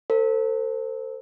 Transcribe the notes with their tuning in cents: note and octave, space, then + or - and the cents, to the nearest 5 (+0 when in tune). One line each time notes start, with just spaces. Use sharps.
A4 +40 C5 +0